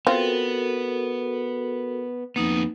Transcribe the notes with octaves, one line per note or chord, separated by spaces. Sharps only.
B3 C4 F4 F#4 A4 A#4
F2 A#3 B3 D#4